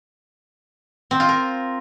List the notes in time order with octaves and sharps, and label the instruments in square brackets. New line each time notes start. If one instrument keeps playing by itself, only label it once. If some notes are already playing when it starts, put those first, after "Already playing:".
[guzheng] C4
F4
A#4